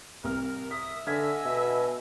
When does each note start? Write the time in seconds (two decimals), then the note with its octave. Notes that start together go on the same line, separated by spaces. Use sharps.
0.24 C2 A#4 F6
0.71 E5 D#6 B6
1.07 D3 D#5 G#5 E6 F6 G#6 B6
1.45 B2 E5